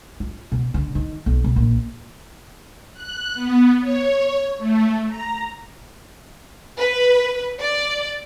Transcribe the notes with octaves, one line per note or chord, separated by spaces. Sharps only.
F4
B2
D3
D#3
B1
B2
A#1
F#6
B3
C#5
A3
A#5
B4
D5